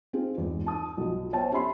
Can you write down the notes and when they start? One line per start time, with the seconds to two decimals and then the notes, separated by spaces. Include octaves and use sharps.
0.13 C4 D#4 F4 G#4
0.38 E2 G#2
0.65 D#4 A5 D#6
0.97 B1 F3
1.33 B3 C5 C#5 E5 G5 A5
1.52 C#4 G4 E5 B5 C6